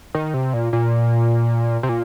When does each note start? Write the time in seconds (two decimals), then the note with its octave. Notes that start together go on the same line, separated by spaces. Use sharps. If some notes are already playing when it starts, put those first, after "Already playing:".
0.15 D#3
0.34 C3
0.54 A#2
0.73 A#2
1.83 C3
1.89 A#2